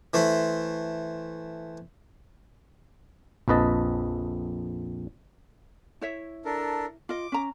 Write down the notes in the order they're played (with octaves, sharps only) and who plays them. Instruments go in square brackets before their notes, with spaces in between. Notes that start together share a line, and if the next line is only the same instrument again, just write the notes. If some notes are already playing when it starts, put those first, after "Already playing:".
[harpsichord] E3 A3 C5 B5 C6
[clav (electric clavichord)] A#1 F2 B4 D#5 A5
[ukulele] E4 C#5 E5
[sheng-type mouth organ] D4 A4 A#4
[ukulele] F4 D#5 [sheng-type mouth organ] D6
[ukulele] C#4 A#5